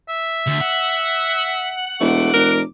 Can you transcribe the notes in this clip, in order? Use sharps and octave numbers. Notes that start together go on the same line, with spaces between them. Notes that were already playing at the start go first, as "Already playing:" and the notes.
E5
D2
F#5
E1 A3 D6
F1 A#4